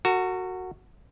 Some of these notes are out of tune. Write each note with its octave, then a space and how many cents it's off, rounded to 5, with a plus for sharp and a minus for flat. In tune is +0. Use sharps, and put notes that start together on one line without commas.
F#4 +0 A#4 -45